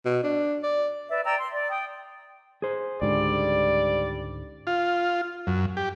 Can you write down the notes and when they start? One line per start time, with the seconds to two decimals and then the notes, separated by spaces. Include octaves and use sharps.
0.05 B2
0.24 D4
0.64 D5
1.10 B4 D5 E5
1.25 D5 G5 A#5 E6
1.37 C6
1.52 D5
1.70 G5 D#6
2.62 G#4 C5
3.02 C#2 G#2 D3 G3 D5
4.67 F4
5.47 F#2
5.77 G4